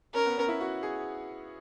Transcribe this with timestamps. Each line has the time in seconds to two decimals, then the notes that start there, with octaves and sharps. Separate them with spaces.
0.14 C#4 A#4
0.26 B3
0.37 C#4
0.48 E4
0.61 F#4
0.83 G#4